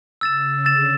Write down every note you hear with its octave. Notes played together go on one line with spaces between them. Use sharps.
C#3 E6 A6 E7
D3 E6 A6 E7